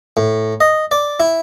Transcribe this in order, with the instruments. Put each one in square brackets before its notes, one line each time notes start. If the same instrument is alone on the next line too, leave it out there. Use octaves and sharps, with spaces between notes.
[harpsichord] A2
D#5
D5
E4